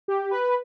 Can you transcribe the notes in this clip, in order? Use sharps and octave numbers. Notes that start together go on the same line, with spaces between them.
G4
B4